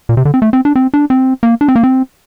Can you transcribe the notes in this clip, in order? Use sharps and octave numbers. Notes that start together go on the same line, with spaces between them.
A#2
C3
D3
C4
A3
C4
D4
C4
D4
C4
A#3
D4
C4
A#3
C4